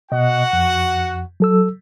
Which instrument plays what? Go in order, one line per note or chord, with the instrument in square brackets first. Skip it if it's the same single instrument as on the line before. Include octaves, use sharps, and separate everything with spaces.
[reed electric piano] B2 D#5 [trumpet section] F#4 F#5
[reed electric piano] F2
F#3 A4 E6